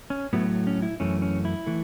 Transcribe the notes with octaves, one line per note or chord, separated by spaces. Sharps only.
C#4
A2 F#3 A3 B3
C#4
E4
F#2 E3 A3 C#4
C#4
E4
E3 A3